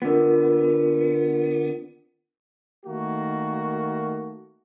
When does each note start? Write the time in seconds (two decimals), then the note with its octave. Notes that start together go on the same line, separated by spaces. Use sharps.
0.02 D3 B3 F4 A#4
2.86 D#3 A3 A#3 F#4